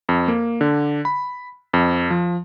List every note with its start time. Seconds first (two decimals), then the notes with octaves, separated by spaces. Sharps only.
0.09 F2
0.28 A#3
0.61 D3
1.05 B5
1.74 F2
2.10 F3